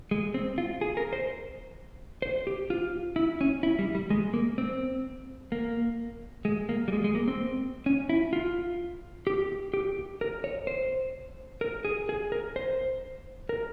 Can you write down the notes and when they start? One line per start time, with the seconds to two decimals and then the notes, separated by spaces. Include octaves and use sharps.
0.11 G#3
0.34 C4
0.58 F4
0.81 G#4
0.97 A#4
1.13 C5
2.22 C5
2.47 G4
2.70 F4
3.16 E4
3.41 C#4
3.63 E4
3.79 G3
3.95 G3
4.10 G#3
4.34 A#3
4.58 C4
5.52 A#3
6.45 G#3
6.69 A#3
6.88 G3
6.93 G#3
7.04 G#3
7.15 A#3
7.28 C4
7.86 C#4
8.09 E4
8.33 F4
9.27 G4
9.74 G4
10.21 A#4
10.44 C#5
10.67 C5
11.61 A#4
11.85 G#4
12.09 G#4
12.32 A#4
12.56 C5
13.49 A#4